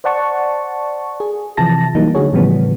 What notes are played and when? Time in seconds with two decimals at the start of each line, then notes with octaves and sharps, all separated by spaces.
0.04 C5 D5 F#5 A5 C#6
1.20 G#4
1.57 C3 E3 F3 E4 A5 A#6
1.95 E3 F#3 G3 A#3 D#4
2.15 D3 A3 F#4 G#4 C#5
2.33 A2 C#3 E3 F3 G3 B3